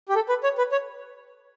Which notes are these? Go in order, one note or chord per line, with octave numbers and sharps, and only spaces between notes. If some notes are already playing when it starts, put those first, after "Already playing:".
G4
A4
B4
C#5
B4
C#5